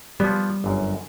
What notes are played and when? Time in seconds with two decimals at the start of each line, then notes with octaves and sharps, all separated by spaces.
0.20 F3 G3 B3
0.64 G1 F#2